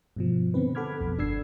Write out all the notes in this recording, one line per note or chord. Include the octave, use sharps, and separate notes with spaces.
G2 B2 F3
D3 B3 C4 B4
A4 F#5 B5 D6 F6 G#6
B1 F2
G1 D4 A4 E6 G#6 C7